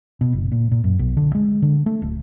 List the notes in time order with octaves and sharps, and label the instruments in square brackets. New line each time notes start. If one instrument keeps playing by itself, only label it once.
[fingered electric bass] B2
F#1
A#2
A#2
F#2
B1
D3
G#3
D3
A3
D1